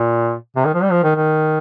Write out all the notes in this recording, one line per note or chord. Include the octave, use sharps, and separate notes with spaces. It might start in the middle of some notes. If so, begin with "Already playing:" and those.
Already playing: A#2
C3
D#3
F3
G3
F3
D#3
D#3